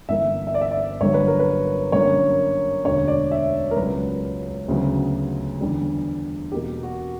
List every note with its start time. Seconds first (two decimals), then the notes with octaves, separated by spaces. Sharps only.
0.09 G1 G2 E3 A#3 E5
0.47 E5
0.54 D5
0.61 E5
0.71 D5
1.01 G1 G2 D3 F#3 A#3 C#5
1.14 B4
1.28 A#4
1.39 B4
1.92 F#2 D3 G3 A#3 C#5
2.84 E1 D2 D3 C#5
3.08 D5
3.31 E5
3.71 A#4
3.76 C#2 C#3 F#3 B4
4.68 D2 C#3 F#3 B3
5.61 E2 D3 G3
6.52 E2 B2 A#3 G4
6.83 F#4